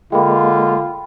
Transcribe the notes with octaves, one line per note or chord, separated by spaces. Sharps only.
D3 G#3 A#3 F4 G5 B5 C6